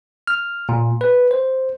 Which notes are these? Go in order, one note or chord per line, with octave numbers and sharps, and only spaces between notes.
F6
A#2
B4
C5